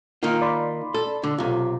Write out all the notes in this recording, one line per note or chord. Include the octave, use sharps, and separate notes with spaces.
D#3 A#3 F4
D5 B5 C6
A4
D3
B1 C3 F4 A4